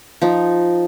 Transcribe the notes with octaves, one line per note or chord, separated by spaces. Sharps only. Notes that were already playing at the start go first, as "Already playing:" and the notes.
F3 D#4